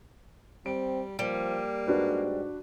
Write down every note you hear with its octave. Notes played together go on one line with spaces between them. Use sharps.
G3 C4 D7
F3 G3 A#3
G#2 D4 F#4 B4